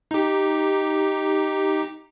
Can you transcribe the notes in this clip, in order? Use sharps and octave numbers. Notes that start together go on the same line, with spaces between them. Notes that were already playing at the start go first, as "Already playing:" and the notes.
D#4 G4